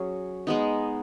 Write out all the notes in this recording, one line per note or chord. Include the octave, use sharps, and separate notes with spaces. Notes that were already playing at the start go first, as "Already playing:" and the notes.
Already playing: F#3 C#4 G#4
G#3 B3 D#4